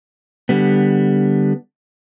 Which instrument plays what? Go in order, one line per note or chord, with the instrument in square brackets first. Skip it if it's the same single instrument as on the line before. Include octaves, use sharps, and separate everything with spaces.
[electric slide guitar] D3 G3 B3